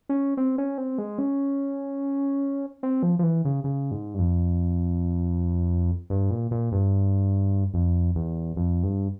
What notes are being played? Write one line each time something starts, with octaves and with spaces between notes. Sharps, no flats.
C#4
C4
C#4
C4
G#3
C#4
C4
F3
F3
E3
C#3
C#3
G#2
G2
F2
G2
A#2
A#2
G2
F2
E2
F2
G2